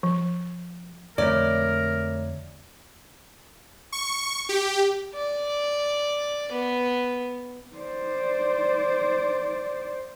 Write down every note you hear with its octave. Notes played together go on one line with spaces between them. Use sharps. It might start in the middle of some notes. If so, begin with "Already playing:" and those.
F3
F2 D3 F3 A3 A#4 C#5 D5
C#6
G4
D5
B3
C5 D5